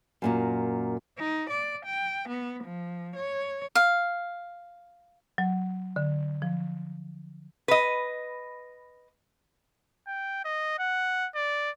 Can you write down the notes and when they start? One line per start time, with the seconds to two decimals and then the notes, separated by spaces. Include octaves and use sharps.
0.22 F#2 A#2 A#3
1.18 D#4
1.50 D5
1.86 G5
2.29 B3
2.64 F3
3.16 C#5
3.75 F5
5.38 F#3
5.96 D3
6.42 F3
7.68 B4 D#5
10.07 G5
10.45 D#5
10.79 F#5
11.35 D5